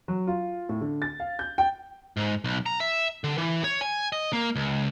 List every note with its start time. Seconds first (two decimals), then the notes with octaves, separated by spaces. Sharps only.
0.08 F#3
0.27 F4
0.69 A2
0.81 D3
1.02 A6
1.20 F5
1.39 G6
1.58 G5
2.17 G#2
2.44 B1
2.66 A#5
2.80 E5
3.24 D3
3.38 E3
3.64 C#5
3.81 G#5
4.12 D#5
4.33 A#3
4.56 C#2